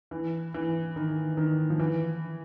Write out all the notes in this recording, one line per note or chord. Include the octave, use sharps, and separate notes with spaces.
E3
E3
D#3
D#3
F3
E3